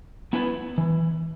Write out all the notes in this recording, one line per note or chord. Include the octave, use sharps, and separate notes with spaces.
B3 E4 B4
E3